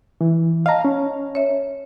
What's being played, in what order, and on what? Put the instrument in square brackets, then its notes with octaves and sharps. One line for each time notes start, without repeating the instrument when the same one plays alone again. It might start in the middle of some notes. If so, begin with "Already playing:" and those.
[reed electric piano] E3
[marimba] D#5 A5 [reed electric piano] F5 A#5
[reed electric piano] C#4
[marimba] C#5 E5